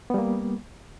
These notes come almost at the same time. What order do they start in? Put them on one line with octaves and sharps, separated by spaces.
B3 G3 A#3